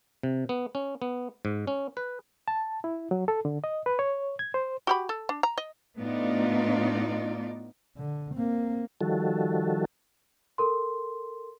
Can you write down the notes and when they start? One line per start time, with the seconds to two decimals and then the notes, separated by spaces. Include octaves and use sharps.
0.23 C3
0.49 B3
0.75 C#4
1.02 B3
1.45 G#2
1.67 C#4
1.97 B4
2.48 A5
2.84 E4
3.11 F#3
3.28 A4
3.45 D3
3.64 D#5
3.86 B4
3.99 C#5
4.39 G#6
4.54 C5
4.87 F#4 G4 B5
5.09 A4
5.29 D4
5.43 A#5
5.58 D#5
5.97 A2 B3 D4 D#4 F4 D5
7.97 D3
8.34 A#3 C4
9.01 D#3 F3 G3 F#4 A4
10.58 A4 A#4 C6